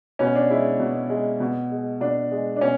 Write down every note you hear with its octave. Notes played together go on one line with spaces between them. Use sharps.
B2 C#4
D4
G#3 E4
B2
G#3
B2
G#3
B2 D4
G#3
D4
B2 C#4